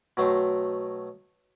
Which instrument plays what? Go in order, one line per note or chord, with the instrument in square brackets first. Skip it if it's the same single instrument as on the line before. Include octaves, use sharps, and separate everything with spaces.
[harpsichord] B2 F#3 A3 G5 C6